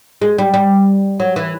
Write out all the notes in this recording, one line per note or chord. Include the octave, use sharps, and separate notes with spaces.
G#3
G3
G3
F#3
E3